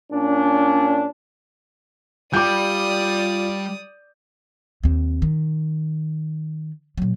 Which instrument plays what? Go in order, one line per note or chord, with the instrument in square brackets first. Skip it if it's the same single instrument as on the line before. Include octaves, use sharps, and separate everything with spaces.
[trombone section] A#2 C#4 D4
[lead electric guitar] G3 G4 [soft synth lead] F4 [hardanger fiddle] D5 D#6 [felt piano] D6 G6
[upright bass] D#2 C4
D#3
A#2 F#3